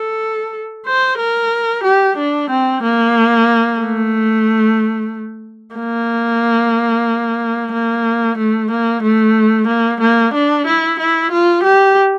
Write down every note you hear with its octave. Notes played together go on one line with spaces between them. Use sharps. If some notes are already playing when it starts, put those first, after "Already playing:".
Already playing: A4
C5
A#4
G4
D4
C4
A#3
A3
A#3
A#3
A3
A#3
A3
A#3
A#3
D4
E4
E4
F4
G4